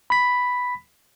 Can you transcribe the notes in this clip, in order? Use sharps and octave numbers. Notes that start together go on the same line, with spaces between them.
B5 B6